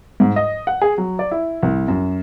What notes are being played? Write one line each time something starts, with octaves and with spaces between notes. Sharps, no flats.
G#2
D#5
F#5
G#4
F#3
D5
E4
C2
F#2